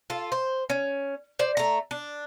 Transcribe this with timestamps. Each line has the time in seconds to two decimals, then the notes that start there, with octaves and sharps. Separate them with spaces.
0.10 F4 A4
0.32 C5
0.70 C#4
1.39 C5 D5
1.57 A3 A#5
1.91 D4